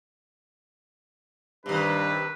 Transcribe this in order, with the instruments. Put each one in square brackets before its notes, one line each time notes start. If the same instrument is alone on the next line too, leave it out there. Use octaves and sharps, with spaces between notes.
[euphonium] G2 [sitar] C3 D#3 [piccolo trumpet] B4